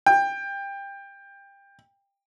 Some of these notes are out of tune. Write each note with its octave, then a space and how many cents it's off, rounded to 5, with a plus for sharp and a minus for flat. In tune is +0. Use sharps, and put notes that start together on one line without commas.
G5 +20